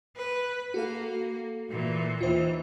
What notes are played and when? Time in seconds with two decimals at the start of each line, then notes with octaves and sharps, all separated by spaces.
0.17 B4
0.74 A#3 F#4 A4 F5
1.70 A#2 E3
2.21 D#2 E3 F4 C5